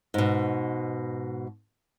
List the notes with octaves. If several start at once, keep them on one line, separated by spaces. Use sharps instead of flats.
G#2 B2